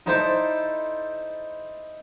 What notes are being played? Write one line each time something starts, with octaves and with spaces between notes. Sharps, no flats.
D#4 E4 A4 C5 D5